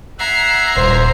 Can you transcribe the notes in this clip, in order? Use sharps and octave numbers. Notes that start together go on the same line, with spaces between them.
E5 F#5 A#5 G#6 C7
D#1 C5